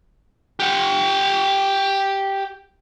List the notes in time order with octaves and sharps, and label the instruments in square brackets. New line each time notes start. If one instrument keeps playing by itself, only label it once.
[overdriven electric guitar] G4 F#5